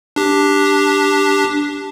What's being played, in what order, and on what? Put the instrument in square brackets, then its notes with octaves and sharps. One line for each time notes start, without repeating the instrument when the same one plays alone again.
[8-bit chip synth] D4 G4